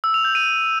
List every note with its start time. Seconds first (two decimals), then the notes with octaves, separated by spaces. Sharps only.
0.04 E6
0.14 F7
0.25 G6
0.35 D#7